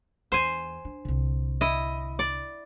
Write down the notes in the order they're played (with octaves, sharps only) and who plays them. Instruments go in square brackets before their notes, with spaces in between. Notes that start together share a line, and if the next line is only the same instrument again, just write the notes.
[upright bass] E2 [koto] C5 G#5
[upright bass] D4
C2 D3
[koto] E4 D#5
D5